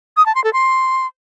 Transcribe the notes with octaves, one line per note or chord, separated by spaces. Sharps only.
D#6
A5
C6
A4
C6